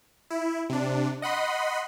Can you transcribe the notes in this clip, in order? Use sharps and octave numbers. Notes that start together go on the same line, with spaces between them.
E4
C3 D4
D#5 F#5 B5 C6